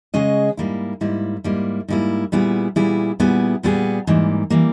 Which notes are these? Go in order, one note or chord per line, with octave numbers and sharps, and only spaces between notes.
C#3 G#3 C#4 G#4 D#5
G#2 G3 A#3 E4
G#2 G3 A#3 E4
G#2 G3 A#3 E4
G#2 G3 A#3 E4
A#2 G3 B3 E4 G#4
A#2 G3 B3 E4 G#4
A#2 G3 B3 E4 G#4
A#2 G3 B3 E4 G#4
G#2 E3 G3 A#3
E3 G3 A#3